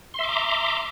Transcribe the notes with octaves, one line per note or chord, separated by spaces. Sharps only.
E5 A#5 C6 D6